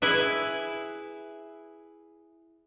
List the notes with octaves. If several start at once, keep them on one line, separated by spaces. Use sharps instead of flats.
E4 G#4 B4 E5